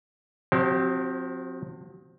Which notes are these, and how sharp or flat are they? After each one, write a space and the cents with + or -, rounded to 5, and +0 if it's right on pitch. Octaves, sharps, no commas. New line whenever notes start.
F3 +40 C4 +0 G4 -40